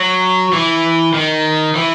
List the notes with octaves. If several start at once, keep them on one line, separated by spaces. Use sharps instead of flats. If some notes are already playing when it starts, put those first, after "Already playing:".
Already playing: F#3
E3
D#3
E3